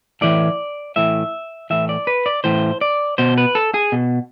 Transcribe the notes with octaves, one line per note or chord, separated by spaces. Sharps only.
A2 E3 D5
A2 E3 E5
A2 E3 E5
D5
B4
D5
A2 E3 C5
D5
B2 C5
B4
A4
G#4
B2